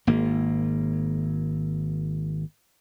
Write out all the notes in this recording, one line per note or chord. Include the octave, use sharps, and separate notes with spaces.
G#1 A#3